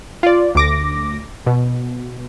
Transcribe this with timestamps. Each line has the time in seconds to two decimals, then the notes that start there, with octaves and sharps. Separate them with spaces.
0.23 F4 D5
0.55 D2 D6 A#6
1.46 B2